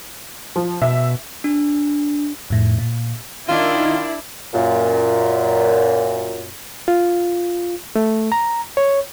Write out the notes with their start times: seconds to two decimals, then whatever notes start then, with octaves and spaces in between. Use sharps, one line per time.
0.56 F3
0.82 B2 E5
1.44 D4
2.50 F2 A2
2.78 A#2
3.49 D#3 D4 E4 F4
4.54 F#2 A#2
6.88 F4
7.96 A3
8.32 A#5
8.77 C#5